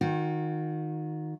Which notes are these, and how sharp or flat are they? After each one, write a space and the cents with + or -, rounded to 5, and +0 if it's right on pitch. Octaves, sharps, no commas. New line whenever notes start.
D#3 +0 F#4 -40